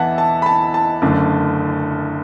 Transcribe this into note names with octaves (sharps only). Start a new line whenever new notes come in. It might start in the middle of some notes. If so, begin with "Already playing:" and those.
Already playing: E2 E3 B3 E5 F#5 A5
A5
B5
A5
A5
F#1 F#2 D3 A3